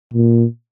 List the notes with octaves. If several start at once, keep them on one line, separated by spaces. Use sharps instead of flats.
A#2